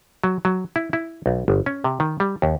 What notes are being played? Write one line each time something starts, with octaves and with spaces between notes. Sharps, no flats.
F#3
F#3
E4
E4
B1
G1
C#4
C3
D#3
G3
D#2